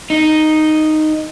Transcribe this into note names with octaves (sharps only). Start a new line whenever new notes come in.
D#4